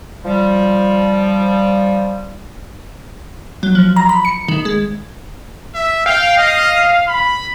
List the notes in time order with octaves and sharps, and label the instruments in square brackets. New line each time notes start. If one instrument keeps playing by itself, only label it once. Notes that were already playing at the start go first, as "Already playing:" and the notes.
[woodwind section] F3 G3
[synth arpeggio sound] F#3
F3
A#5
B5
C#7
D#3
G#3
[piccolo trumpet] E5
[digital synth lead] F5 [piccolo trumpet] G5
[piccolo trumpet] D#5
B5